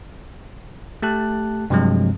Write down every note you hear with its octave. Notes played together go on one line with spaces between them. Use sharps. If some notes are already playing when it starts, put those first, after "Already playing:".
A3 G4 A5 F#6
G2 C3 F3 F#3 G#3 C4